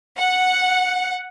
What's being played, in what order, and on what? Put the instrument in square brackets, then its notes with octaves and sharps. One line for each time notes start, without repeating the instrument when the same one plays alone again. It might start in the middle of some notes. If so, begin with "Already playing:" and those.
[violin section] F#5